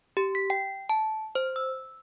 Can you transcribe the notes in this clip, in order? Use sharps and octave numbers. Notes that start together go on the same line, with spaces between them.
G4
B6
G5
A5
C5
E6